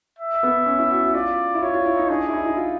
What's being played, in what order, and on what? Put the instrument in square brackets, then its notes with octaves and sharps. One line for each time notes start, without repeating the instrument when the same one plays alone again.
[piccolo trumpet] E5
[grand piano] B3
C#4
E4
F#4
F#4
[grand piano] F4 [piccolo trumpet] D5
[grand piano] E4
[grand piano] F4 [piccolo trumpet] C#5
[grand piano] F4
E4
D#4
[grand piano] D4 [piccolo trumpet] G#4
[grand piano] E4
D#4
E4
F4